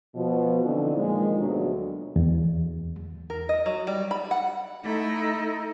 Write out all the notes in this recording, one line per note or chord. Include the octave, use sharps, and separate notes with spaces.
B2 F3
D3 E3 C4 D#4 F4
A#2 D#3 F3 G#3
D2 B2 F#3
E2
A#4
D#5
F#3
G3
B5
F#5
A3 D#4 E4 A4